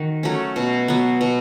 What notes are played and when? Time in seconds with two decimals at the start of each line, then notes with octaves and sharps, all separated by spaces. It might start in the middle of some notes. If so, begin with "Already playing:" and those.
Already playing: D#3 F#4
0.23 F#3 A3 C#4
0.56 B2
0.88 F#3 B3
1.21 B2